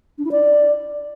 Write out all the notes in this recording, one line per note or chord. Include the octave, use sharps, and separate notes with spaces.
D4
E4
D5